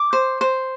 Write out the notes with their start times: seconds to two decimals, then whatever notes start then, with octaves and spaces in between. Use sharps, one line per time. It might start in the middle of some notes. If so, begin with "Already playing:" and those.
Already playing: D6
0.13 C5
0.41 C5